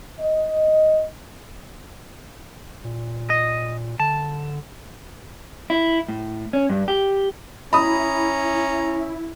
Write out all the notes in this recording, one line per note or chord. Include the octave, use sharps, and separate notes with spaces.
D#5
A#2
D#5
D3 A5
E4
A2
C#4
G2
G4
C#4 E4 A#5 B5 D#6